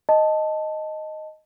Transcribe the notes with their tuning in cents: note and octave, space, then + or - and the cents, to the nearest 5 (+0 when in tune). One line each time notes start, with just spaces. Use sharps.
D#5 +0 A5 +0